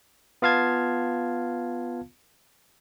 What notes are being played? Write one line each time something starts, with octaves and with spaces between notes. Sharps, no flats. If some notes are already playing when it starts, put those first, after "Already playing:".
B3 F4 F5 A5 G#6